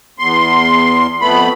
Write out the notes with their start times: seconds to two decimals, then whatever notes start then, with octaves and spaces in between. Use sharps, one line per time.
0.19 E2 C6
1.21 F2 A3 B3 B5